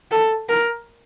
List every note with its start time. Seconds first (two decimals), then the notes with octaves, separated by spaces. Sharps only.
0.12 A4
0.49 A#4